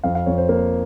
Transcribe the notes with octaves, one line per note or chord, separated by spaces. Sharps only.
F2 F5
F5
F2 C#5
C5
A#3